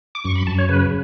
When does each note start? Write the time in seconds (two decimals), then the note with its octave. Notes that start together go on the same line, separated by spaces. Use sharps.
0.15 D6
0.25 F#2 C#6
0.35 B5
0.47 F#2 A5
0.59 C#5
0.69 C#3 B4